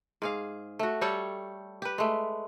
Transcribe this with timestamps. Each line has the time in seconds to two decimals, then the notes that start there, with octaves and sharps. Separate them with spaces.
0.22 G#2 G#4 F5
0.79 A3 F#4
1.01 G3 G4 A4 C#5
1.82 G4 B4
1.98 G#3 A3